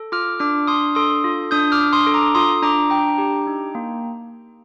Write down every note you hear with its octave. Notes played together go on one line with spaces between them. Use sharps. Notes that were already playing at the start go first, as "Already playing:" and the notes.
Already playing: A4
F4 D6 F6
D4 D6 F6
D4 C6 D#6
A4 C6 D#6
F4
D4 D#6 G6
D6 F6
D4
C6 D#6
A4
A#5 D6
F4 C6 D#6
D4 A#5 D6
D4 G5 A#5
G4
D#4
A#3